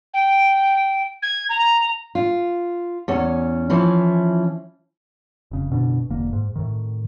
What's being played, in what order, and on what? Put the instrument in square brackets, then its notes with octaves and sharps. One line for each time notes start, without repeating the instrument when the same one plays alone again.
[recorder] G5
G#6
A#5
[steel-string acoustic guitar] F4
E2 C#4
E3 F3 C#4 E4
[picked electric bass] F1 C#3
F#1 B2 D3
E1 D3 A#3
G#2
A2 D#3